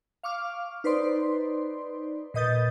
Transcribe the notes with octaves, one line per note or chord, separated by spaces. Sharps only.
F5 C#6 D6 F6
D#4 B4 C5 D5 C6
A#2 B4 D#5 D#6 G6 A6